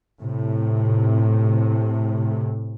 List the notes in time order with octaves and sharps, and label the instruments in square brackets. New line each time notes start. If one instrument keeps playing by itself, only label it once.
[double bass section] A2 C3